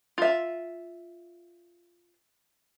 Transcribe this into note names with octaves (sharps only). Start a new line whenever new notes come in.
F4 E5